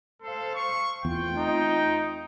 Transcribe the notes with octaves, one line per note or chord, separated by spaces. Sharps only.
A4 C5 F5
C#6
E2 A3 C4 F4 G5
D#4